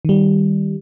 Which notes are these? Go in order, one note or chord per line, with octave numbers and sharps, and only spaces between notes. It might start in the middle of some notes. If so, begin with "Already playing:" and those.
D#3 G3